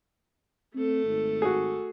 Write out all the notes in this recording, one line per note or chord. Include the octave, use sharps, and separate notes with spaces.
A3 C4 A4
G#1
F#4 G#4